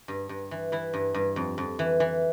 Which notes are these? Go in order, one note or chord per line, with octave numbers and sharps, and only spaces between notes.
G2
G2
E3
E3 E4
G2
G2
F2
F2
E3
E3